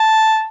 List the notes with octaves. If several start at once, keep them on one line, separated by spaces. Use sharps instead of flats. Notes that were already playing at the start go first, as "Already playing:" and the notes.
Already playing: A5